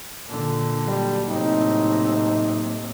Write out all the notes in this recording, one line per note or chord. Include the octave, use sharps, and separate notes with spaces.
A#2 D3
F#3 G3 A#3 D#5
A2 C3 D#4